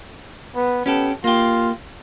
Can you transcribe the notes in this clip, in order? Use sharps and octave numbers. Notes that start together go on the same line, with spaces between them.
B3
B3 C#4 G4 A4
A#3 F4 G4